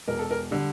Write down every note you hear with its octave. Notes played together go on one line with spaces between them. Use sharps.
E1 A#4
A4
A#4
D3 G3